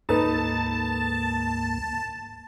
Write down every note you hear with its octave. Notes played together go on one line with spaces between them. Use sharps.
D2 G#2 A#3 D#4 A4 B4 A5